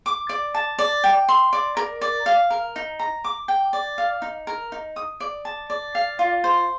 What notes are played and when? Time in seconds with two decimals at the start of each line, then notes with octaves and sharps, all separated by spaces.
0.06 D6
0.29 D5
0.55 A5
0.79 D5
1.04 G5
1.29 C6
1.53 D5
1.77 A#4
2.01 D5
2.26 F5
2.51 A#4
2.76 D#4
2.99 A#5
3.24 D6
3.48 G5
3.73 D5
3.98 F5
4.22 D#4
4.47 A#4
4.72 D#4
4.96 D#6
5.20 D5
5.45 A5
5.70 D5
5.95 F5
6.19 F4
6.44 C5